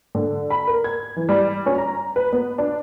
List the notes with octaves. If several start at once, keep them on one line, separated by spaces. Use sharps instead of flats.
D3
B5
A#4
G#6
E3
G3
C#4
A#5
B4
B3
D4